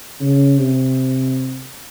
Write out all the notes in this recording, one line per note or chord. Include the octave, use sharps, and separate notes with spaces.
C#3
C3